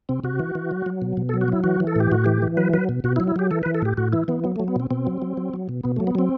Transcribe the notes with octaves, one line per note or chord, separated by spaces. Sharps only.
C3 C4
C3 F#4
E3
E3
F#3
F#3
B2
B2
A4
F#3
F#4
F#3 E4
E3 F#4
E3
A4
A2 G4
A2 F#4
E3 G4
E3
F#3 B4
F#3 B4
B2
B2 F#4
E4
F#3
E4
F#3 G4
E3 A4
E3 B4
A4
A2 G4
A2 F#4
E3 E4
E3 B3
F#3 B3
A3
F#3
B3
B2 C4
B2 C4
F#3
F#3
F#3
F#3
B2
B2 B3
A3
F#3
B3
F#3 C4